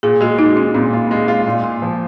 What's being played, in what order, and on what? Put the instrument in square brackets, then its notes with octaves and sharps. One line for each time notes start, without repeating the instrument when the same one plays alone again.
[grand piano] A#2 [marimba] G#4
[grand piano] G#3 [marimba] F#4
[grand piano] G#3 [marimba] D#4
[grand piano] G#3 [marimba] C#4
[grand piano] A#2 [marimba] C4
[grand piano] F4
G#3
F4
A#2
A#2
F3